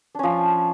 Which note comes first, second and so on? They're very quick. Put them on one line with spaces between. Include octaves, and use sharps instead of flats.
D4 C#4 F3